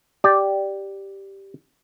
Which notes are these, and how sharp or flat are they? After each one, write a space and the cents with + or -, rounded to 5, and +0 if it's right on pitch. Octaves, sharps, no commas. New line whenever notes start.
G4 +0 D5 +0